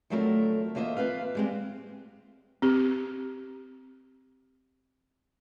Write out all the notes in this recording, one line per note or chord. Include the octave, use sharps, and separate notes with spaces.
D2 F3 F#3 A3 C4 A#4
E2 A3 A#3 F4 D#5 E5
C4 F4 B4 F5
G3 G#3 C4
C4 G4